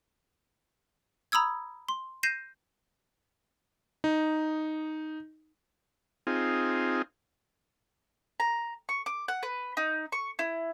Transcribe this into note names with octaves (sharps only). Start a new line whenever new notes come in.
A#5 B5 D#6 E6 G#6
C6
G6 A#6 C7 D#7 E7
D#4
C4 D#4 F4 G#4
A#5
C#6
D6
F#5
B4
D#4
C#6
E4